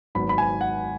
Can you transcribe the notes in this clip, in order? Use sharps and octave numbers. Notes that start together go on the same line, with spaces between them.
G#1 G#2 F#3 B3 B5
B5
G#5
F#5